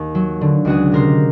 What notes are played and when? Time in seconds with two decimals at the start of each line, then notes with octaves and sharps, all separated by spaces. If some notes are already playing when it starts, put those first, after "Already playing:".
Already playing: D#2
0.15 F#3
0.41 D3
0.65 C#2 F#4 G#4
0.92 C3 A#4 C5